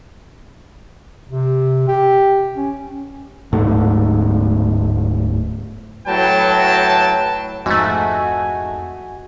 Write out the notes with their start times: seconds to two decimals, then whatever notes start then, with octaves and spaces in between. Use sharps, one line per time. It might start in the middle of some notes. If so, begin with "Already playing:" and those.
1.29 C3
1.88 G4
2.57 C#4
3.53 D1 G#2 A3
6.07 A2 F#3 B4 G5 A5
7.66 F2 G#2 A3 F#4 D#5 G#5